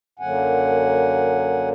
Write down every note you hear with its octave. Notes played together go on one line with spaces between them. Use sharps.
F#2 D3 F#3 A#3 F#5 G#5